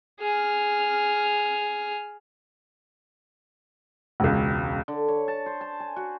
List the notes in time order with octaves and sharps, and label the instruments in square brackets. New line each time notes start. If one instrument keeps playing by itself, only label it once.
[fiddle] G#4 F6
[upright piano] E1 C#2
[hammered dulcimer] D3
C#5
A5
C5
A5
G#5
F#4